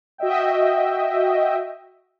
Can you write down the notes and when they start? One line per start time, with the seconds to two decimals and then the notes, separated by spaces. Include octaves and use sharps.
0.18 F#4 D#5 E5 G5